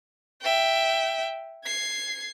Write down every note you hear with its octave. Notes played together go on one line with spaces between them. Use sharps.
E5 G5
G#6 C7